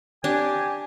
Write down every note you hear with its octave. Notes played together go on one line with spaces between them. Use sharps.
D4 G4 G#5